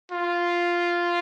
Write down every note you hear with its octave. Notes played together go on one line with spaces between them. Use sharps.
F4